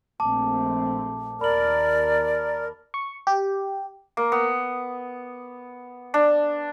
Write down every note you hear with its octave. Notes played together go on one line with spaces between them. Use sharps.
A#1 A3 C4 A5 D6
D#2 A#4 D5 B5 F#7
C#6
G4
A#3
B3
D4